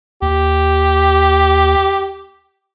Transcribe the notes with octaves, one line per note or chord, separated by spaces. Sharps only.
D#2 G4